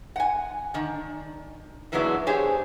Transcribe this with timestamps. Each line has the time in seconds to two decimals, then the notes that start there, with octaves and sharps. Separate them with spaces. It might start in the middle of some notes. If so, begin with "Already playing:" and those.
0.16 F#5 G#5
0.74 D#3 D4
1.92 A#2 E3 F#3 G#3 B3 D4
2.27 D4 G4 G#4 C5 C#5